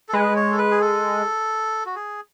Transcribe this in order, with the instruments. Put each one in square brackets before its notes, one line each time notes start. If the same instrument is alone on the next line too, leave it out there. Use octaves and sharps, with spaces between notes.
[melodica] A4
[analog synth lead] G#3 [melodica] B4
[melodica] C#5
A4
B4
G#4
A4
F#4
G#4